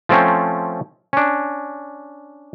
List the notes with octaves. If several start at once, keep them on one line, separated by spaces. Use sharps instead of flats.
F3 A3 C4 C#4
C#4 D4